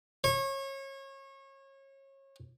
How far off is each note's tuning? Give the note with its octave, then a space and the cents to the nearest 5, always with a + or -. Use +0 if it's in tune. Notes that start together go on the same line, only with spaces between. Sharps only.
C#5 -30